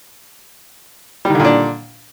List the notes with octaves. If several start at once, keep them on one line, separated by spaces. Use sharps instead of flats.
A#2 D3 D#3 G3 D4